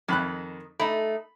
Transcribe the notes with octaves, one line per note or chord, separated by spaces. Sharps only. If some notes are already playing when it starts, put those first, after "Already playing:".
F2 D#3 B5 F#6
A3 D#4 B5